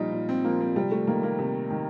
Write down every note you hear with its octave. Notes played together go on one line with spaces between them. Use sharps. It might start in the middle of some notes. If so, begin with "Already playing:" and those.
Already playing: A#2 F3 G3 D#4 F4
A#2
C4
F3 A#3
C4
C3 G3
A3
D#3 A#3
A#3
C3
D#3